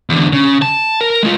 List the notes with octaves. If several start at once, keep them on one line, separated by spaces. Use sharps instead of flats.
E2 D3
C#3
A5
A#4
G#3 F4